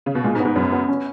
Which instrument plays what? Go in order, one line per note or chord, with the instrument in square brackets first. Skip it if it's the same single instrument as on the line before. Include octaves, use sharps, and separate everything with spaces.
[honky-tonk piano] C#3
B2
[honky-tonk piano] A#2 [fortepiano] G#3
[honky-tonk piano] G#2
[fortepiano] B3
[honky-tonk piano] G#2
[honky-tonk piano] F#2 [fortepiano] B3
[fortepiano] B3
C#4